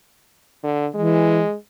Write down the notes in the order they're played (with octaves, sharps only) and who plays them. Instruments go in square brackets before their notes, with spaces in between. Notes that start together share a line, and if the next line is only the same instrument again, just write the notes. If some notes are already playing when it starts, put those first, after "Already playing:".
[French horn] D3
[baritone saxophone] E3 [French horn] G#3